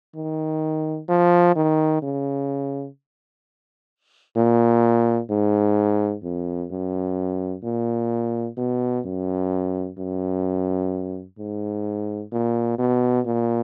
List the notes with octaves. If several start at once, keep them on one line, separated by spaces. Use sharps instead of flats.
D#3
F3
D#3
C#3
A#2
G#2
F2
F#2
A#2
B2
F#2
F#2
G#2
A#2
B2
A#2